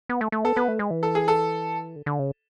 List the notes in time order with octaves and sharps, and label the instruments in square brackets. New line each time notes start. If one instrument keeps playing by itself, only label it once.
[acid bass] B3
A3
A3
[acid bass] B3 [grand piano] A4
[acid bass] B3 [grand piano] B4
[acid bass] A3
G#3
E3
[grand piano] A4
G#4
A4
[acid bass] D3
D3
C#3